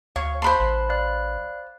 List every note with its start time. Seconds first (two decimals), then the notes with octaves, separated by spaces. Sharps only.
0.16 D2 C#5 F5 C#6
0.42 C5 A5 B5 C6 F#6
0.59 A1
0.89 D5 F5 F#6